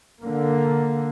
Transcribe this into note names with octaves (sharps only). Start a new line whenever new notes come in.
D3 A#3